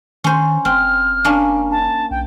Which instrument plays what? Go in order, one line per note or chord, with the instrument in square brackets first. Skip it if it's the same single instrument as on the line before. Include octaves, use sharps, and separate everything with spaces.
[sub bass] D#3 [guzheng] C#4 C5
[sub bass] F#1 [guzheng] C4 [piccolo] F6
[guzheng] A#3 C#4 D4
[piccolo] A5
[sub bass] B1 [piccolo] G5